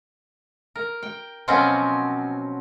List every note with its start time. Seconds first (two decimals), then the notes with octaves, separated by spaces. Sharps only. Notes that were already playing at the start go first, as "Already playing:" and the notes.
0.76 A#4
1.03 G5
1.48 B2 F3 F#3 C4 C#4